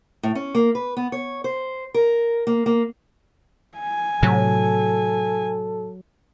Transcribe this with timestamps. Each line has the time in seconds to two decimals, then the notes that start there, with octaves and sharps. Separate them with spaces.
0.23 A2
0.35 C#4
0.55 A#3
0.75 B4
0.97 B3
1.12 C#5
1.44 C5
1.94 A#4
2.47 A#3
2.66 A#3
3.78 G#5
4.23 A2 C3 F#3 A4